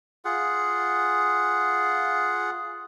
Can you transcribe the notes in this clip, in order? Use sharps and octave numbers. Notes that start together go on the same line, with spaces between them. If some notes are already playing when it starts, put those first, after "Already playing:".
F4 G#4 F#5